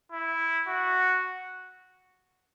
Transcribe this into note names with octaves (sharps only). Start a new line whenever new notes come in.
E4
F#4